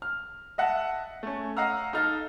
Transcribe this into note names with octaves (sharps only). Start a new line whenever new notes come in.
F6
D#5 E5 F#5 A5
A3 C#4
D#5 F5 F#5 A#5 E6 F6
D#4 A4 F5 F6 A6